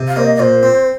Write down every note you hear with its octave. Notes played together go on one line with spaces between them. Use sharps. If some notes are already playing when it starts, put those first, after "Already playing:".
Already playing: C3
F5
A#3 C5
D#5
D#5
A#2 C5
C4